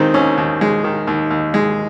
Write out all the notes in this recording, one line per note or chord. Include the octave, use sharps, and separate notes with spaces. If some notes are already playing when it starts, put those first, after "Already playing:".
Already playing: D#2 D#3 G#3 C4 D#4
D#2 C#4
D#2
G#3
D#3
D#2
D#2
G#3